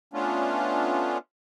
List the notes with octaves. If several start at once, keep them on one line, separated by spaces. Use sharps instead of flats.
A3 B3 C#4 D4 F4